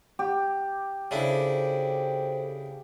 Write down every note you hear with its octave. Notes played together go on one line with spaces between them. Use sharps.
G4
C#3 D4 E4 A4 C5